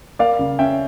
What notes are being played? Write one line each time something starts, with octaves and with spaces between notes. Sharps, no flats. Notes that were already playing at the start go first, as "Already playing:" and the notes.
A#3 D5 F5
C#3
C#4 E5 G5